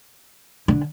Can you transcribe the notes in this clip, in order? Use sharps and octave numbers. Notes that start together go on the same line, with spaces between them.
D3